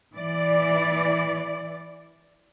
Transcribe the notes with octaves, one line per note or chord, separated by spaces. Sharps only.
E3 D5